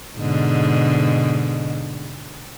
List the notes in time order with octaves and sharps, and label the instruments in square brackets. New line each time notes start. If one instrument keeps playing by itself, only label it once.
[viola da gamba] G#2 B2 D3